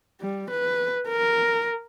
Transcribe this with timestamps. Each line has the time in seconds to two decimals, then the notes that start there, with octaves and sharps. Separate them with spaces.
0.21 G3
0.50 B4
1.09 A#4